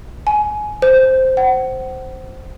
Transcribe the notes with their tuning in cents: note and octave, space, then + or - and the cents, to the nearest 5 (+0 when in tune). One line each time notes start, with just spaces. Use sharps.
G#5 +20
C5 +0
F#5 +35